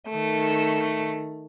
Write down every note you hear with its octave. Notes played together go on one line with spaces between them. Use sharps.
D#3 A3